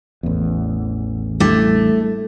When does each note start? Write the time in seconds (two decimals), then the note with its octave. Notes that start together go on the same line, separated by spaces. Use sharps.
0.23 A1 E2
1.40 G3 A3 D4 E4